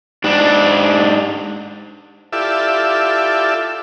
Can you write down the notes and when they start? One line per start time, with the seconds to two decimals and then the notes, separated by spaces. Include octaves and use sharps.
0.24 G#2 D4
2.32 E4 F4 G4 A4 D5 E5